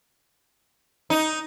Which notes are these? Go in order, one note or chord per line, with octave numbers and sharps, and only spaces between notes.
D#4